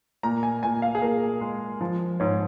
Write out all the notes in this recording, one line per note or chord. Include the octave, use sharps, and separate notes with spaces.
A#2 A#5
G#5
A#2 G#5
F5
G#4
A#2 A#4
G#3
F3
G#2 C#5